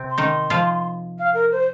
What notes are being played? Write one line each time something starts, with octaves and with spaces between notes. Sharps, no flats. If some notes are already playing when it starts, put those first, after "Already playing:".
Already playing: C3 C4
C6
D#3 D#4
F3 F4
F5
A#4
C5